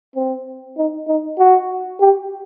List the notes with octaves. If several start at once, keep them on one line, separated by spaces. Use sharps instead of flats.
C4
D#4
D#4
F#4
G4